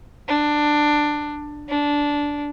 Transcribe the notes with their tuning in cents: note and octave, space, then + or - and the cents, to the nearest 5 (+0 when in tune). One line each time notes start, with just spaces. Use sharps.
D4 +10
D4 -10